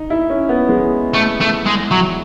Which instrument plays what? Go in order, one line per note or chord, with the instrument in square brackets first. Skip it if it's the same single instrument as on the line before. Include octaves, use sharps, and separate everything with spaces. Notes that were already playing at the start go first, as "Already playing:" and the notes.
Already playing: [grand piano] D#4
E4
C#4
B3
G#3
[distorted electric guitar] A3
A3
G#3
F#3